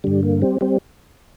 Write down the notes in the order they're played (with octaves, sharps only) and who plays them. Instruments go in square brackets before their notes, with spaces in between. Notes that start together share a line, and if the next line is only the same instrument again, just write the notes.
[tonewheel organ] G2 D3 G3
A#3
G3 C4
G3 C4